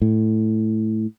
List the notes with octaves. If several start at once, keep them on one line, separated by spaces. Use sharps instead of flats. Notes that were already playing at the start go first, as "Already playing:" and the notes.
A2